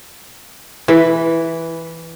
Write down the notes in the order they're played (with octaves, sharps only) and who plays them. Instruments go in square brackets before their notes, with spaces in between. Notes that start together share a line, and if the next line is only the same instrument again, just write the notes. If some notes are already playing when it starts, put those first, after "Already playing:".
[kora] E3 [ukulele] B4